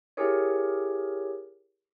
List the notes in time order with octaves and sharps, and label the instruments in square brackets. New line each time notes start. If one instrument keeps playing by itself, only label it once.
[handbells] E4 G4 G#4 A#4 C#5